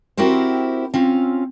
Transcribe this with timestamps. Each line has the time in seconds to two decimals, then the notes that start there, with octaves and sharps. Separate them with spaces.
0.17 C4 E4 F#4 G4 A#4 C5
0.94 C4 C#4 F4